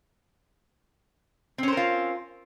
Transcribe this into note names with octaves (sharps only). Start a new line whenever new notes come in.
C4 C#4 F4 A#4 C5